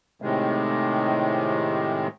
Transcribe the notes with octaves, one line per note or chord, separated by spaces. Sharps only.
A2 C3 D#3 G#3